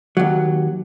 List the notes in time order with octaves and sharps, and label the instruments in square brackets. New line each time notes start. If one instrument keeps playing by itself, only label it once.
[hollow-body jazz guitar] D#2 F#3